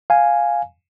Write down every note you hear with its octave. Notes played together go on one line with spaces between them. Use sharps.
F5 G#5